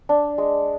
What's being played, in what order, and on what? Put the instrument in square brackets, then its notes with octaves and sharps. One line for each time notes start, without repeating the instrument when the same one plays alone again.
[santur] D4
G#3